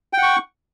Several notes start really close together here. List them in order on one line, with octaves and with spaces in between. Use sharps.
G5 F#5 C#6